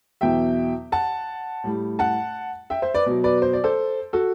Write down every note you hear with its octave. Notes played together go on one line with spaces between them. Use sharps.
E2 B2 F#3 E5 G5
F#5 A5
A2 G3
F#5 A5
E5 G5
C5 E5
B4 D5
B2 F#3
B4 D5
C5
D5
A4 C5
F#4 A4